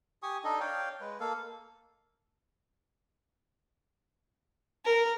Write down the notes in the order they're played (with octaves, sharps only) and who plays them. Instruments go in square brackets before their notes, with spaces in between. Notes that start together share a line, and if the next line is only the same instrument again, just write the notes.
[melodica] G4 G#5 C#6 D#6
D4 D#4 A4 D#5
C#5 D5 F5 G5
G#3 B4
A#3 A4 F5
[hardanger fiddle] A#4